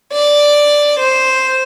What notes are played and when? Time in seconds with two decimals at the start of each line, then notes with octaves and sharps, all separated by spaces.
0.13 D5
1.00 C5